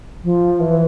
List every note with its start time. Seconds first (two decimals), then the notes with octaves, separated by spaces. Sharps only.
0.24 F3
0.60 E3